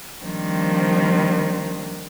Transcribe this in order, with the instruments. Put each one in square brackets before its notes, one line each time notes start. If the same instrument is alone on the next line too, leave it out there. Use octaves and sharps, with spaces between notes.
[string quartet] D#3 F3 G3 A#3 C4 D4